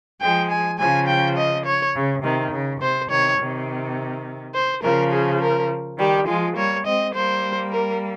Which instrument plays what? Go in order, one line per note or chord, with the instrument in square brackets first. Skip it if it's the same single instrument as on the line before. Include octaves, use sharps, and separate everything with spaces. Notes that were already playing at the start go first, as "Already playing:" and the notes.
[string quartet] F3 G#3 [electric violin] G5
[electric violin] G#5
[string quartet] C#3 F3 [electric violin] G#5
[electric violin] G5
D#5
C#5
[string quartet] C#3
C3 D#3
C#3
[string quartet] C3 [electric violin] C5
[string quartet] C3 D#3 [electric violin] C#5
[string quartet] C3 D#3
[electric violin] C5
[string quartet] C#3 F3 [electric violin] A#4
[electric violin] G#4
A#4
[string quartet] D#3 G3 [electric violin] G4
[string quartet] F3 G#3 [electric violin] F4
[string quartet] G3 A#3 [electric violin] C#5
[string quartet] G#3 C4 [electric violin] D#5
[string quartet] G3 A#3 [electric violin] C5
[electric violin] A#4